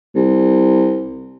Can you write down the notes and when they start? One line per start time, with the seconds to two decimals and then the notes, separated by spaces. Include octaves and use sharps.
0.15 C2